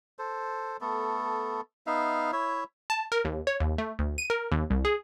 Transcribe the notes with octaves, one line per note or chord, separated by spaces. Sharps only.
A4 C5
A3 B3 A4
B3 D#4 E5 F5
E4 C#5 E5
A5
A#4
D#2
C#5
D#2
A3
D2
D#7
A#4
D#2
C2
G#4